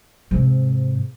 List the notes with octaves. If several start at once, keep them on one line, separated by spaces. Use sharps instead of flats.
G#2 C3